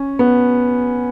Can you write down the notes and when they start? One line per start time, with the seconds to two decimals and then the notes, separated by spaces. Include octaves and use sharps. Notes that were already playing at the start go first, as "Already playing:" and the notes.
Already playing: C#4
0.19 B3